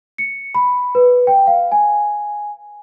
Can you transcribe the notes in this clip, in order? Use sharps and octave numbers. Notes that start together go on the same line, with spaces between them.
C#7
B5
B4
G5
F5
G#5